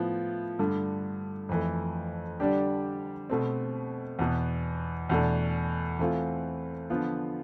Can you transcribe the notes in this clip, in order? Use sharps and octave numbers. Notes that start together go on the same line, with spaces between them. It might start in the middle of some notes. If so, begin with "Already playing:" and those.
Already playing: A2 F3 B3 E4
G2 D3 A3
F2 E3 A3
D3 G3 D4 G4
B2 A3 C4
E2 B2 B3
E2 B2 A3 D4
E3 A3 C4 F4
D3 F3 B3 F4